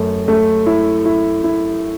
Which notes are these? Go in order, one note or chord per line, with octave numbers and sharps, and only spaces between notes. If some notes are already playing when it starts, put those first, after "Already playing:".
Already playing: F#2 A3
A3
E4
E4
E4